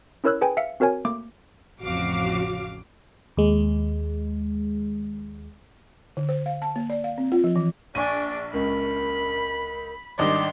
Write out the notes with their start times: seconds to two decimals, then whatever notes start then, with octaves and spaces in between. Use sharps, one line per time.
0.24 C#4 E4 A#4 C#5 E6 F#6
0.41 G#4 B4 G5 G#5
0.57 E5 F5 C#7
0.80 C4 F#4 A#4 C#5 G#5
1.05 A3 A#3 D6
1.82 A1 F2 C#3 F#4 F5 D6
3.37 D#2 G#3
6.17 D3
6.29 C5
6.46 F5
6.62 A5
6.76 A#3
6.90 D5
7.04 F5
7.18 C4
7.32 F4
7.44 F3
7.56 E3
7.95 A#1 D4 G#5 C#6 D#7
8.54 C#2 A#4 B5
10.19 G#1 D#3 G3 D4 D#5 C6 D6